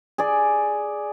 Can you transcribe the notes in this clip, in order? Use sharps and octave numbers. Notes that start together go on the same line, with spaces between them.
G#4 D5